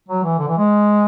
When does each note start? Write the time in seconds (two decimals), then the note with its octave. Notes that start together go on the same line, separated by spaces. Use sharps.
0.09 F#3
0.23 E3
0.38 D3
0.48 E3
0.57 G#3